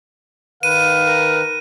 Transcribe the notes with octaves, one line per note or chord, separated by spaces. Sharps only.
D#3 B4 F5 D#7
A#4